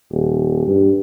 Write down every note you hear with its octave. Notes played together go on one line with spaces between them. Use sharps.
D#1
G2